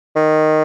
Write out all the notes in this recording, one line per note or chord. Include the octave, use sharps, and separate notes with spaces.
D#3